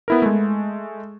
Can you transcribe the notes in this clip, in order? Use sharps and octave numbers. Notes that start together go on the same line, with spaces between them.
B3 E4 A#4
G#3 A3